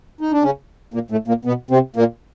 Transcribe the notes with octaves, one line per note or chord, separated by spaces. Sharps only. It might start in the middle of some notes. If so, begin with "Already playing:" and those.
D#4
D4
C#3 C#4
A#2 A#3
A2 A3
A#2 A#3
B2 B3
C3 C4
A#2 A#3